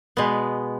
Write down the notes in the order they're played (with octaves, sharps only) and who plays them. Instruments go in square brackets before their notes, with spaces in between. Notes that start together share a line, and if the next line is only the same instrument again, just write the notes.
[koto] B2 G#3 B3